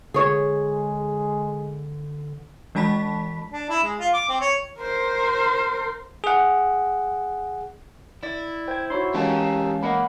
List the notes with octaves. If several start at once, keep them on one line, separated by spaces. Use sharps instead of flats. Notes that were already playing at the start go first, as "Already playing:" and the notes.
D3 G#3 G#4 C#5
E3 G#3 A5 B5 B6
D4
E4
G#3
F4
D6
C4
C#5
A#4 C5
G#4 F#5
E4 D5
C5 G5 G#6
D#4 F#4 C#5 B5 C6
E3 G#3 C#4 G4 A#4 C#5 F5 A5
A#3 D#5 F#5 B5